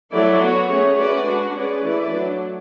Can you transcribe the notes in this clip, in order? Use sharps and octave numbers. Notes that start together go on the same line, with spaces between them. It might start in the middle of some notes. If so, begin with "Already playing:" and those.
F#3 A3 E4 A4 D5
B3 F#4 C#5
A3 C#4 G#4 C#5
A3 C#4 F#4 B4 D5
G#3 D4 F#4
C#4 G#4 B4 D5
E3 A3 E4 B4 D5
F#3 A3 D4